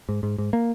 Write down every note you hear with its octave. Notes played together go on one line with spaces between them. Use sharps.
G#2
G#2
G#2
A#3